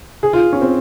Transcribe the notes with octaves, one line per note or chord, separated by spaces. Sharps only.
G#4
F4
C#4
C4